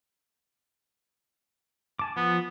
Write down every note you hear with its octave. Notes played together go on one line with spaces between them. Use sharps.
G#5 A5 D6
F3 B3